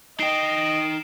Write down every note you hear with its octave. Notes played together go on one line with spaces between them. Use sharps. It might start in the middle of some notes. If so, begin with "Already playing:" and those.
D#4 D#5 G5 C7 D7 E7